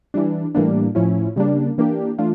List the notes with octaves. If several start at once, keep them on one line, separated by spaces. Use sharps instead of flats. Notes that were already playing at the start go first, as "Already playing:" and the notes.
E3 G3 D4
A2 E3 G3 A#3 D4
A2 F3 C#4 E4
C#3 G3 A#3 D4
E3 A#3 D4 G4
E3 A3 D4 F4